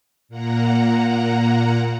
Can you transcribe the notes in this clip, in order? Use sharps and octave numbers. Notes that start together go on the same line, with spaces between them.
A#2 A#3 F#5 A#5